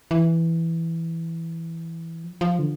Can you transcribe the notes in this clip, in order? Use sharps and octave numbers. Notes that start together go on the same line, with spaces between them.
E3
F3
F3
D3